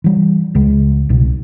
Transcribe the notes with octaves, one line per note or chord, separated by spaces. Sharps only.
E3 G3
C#2 C#3 G#3
C2 B2